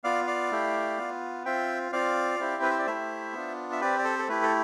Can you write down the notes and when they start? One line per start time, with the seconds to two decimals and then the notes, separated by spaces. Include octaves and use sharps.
0.04 B3 F4 D5 F5
0.27 D5 F5
0.51 A3 E4 G4
0.98 B3 F4
1.45 C4 F4 E5 G5
1.92 C4 F4 D5 F5
2.40 C4 E4 G4
2.62 B4
2.70 C5
2.79 D5
2.87 A3 E4 G4 C5 E5
3.33 B3 D4 F4
3.72 E5
3.81 C4 G4 B4 D5
3.99 D5
4.04 A4 C5
4.19 A4
4.29 A3 E4 G4 B4
4.42 A4